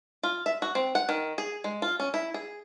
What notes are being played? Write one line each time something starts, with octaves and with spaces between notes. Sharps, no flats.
F4
E5
F#4
C4
F#5
D#3
G#4
G#3
F4
C#4
E4
G#4